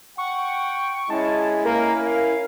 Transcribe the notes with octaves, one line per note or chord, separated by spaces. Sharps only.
F#5 G5 C#6
G#3 C#4 E4 A5
A#3 A#4
F5